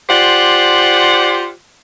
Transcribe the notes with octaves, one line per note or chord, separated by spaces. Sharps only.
F4 G4 C5 D5 F#5